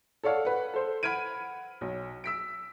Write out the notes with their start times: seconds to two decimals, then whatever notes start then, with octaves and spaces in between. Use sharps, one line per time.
0.23 A4 C#5 D5 F5 F#5
0.45 B4 F#5
0.74 A4 C5
1.03 F#5 B5 F6 G#6 D7 D#7
1.81 B1
2.24 E6 B6 D7